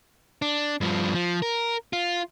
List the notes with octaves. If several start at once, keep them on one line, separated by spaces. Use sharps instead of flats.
D4
G2 F3
F3
A#4
F4